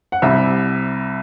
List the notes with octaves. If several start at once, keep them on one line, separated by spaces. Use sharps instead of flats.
F#5
C2 C3 G3 E5